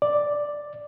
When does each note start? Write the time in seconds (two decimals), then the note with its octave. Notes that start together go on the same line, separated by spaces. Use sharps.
0.02 D5